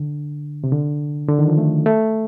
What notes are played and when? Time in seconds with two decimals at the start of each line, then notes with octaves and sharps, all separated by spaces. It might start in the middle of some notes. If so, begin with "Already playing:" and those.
Already playing: D3
0.64 C3
0.72 D3
1.29 D3
1.39 D#3
1.48 F3
1.58 A3
1.86 A3